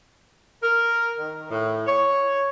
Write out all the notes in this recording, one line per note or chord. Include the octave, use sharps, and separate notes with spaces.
A#4
D#3
A2
C#5